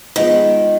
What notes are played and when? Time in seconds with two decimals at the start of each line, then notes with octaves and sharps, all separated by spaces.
0.16 D#3 F3 G#3 B3